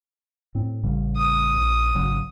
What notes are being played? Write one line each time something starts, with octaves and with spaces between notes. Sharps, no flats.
A2 C4
A1 C#3 G3
D#6
A#1
G#1 C#3 F#3